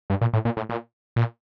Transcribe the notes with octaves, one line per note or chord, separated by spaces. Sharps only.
G2
A#2
A2
A#2
A2
A#2
A#2